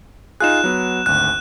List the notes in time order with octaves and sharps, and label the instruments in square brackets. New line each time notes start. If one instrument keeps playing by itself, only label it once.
[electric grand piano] D#4 F4 G#4 [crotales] F#6 E7
[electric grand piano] F#3 B3
[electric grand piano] G#1 D2 [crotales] F#6